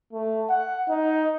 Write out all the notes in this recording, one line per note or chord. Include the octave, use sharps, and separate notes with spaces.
A3
F#5
D#4